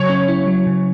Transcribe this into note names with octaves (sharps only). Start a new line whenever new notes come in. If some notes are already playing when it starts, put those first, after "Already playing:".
Already playing: C#3 F#3 C#5
C#4
E4
F#3
C#3